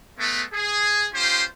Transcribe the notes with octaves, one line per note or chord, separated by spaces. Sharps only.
G#3 A3 B3
G#4
C#4 F4 G4 C5